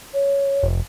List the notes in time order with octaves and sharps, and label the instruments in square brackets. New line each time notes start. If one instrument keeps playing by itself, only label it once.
[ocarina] C#5
[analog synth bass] F1